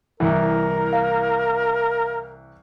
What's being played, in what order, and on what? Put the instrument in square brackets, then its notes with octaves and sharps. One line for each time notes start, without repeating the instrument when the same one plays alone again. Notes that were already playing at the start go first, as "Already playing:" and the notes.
[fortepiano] C2 E3 [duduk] A#4 [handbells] B4
[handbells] F5